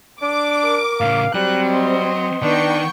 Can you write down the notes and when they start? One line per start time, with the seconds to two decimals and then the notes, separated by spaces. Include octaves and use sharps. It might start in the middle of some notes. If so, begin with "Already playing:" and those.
0.22 D4 D6
0.65 A#4
1.00 A2 C#3 F5
1.35 F#3 G3 C4 F#6
1.68 D#5 C6
2.43 D#3 B3 D4 G5 C#6